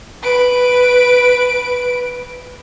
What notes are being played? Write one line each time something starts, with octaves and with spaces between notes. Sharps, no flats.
B4 D7